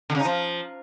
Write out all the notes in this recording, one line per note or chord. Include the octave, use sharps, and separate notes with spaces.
D3
C#3
D#4
F3